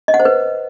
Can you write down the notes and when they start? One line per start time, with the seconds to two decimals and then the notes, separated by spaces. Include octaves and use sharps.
0.08 D#5
0.14 F#5
0.20 C5
0.25 B4